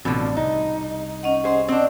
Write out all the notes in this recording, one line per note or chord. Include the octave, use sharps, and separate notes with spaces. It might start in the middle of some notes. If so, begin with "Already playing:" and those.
A1 B2 D3 F3 C4
C2 D#4
C#4 D#5 F#5
G#4 C5
C4 D4